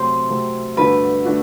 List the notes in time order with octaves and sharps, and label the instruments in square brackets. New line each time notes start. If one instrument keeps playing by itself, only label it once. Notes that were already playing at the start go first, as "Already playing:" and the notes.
Already playing: [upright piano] C3 F#3 A3 C4 [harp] C5
[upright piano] C3 F#3 A3 C4
[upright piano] G2 D3 A3 D4 F#4 [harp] B4
[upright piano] D3 A3 D4 F#4